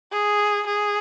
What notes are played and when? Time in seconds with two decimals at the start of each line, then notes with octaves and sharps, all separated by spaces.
0.12 G#4
0.66 G#4